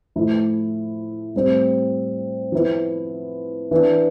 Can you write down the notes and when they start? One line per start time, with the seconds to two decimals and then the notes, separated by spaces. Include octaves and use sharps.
0.16 A2 F3 A3 E4
1.34 A2 G3 C4
2.52 F3 B3 E4
3.71 E3 B3 D4